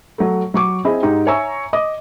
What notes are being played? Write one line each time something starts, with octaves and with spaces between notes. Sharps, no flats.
F#3 A3
F#3 C#6 D6
C4 E4 G#4 D#5 G#5 B5
G#2 D#4 G4
C#5 E5 G#5 A#5 C#6 E6
D#5 D6 D#6